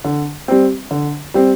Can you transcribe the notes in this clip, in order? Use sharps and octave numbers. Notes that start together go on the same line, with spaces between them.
D3
G3 C4
D3
G3 C4